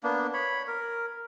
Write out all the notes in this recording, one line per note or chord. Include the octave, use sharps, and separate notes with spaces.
A#3 B3 D4
C#5 B5
A#4